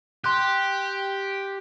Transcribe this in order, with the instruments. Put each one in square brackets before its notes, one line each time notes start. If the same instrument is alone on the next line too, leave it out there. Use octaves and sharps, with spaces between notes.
[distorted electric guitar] G4 [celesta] C6 F#6